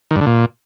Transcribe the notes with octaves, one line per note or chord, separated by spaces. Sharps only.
D#3
G2
D3
A#2